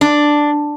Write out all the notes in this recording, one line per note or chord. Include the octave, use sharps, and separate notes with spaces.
D4